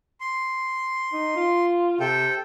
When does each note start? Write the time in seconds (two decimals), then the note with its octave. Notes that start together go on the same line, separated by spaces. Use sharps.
0.20 C6
1.13 D#4
1.36 F4
2.00 C3 A4 G5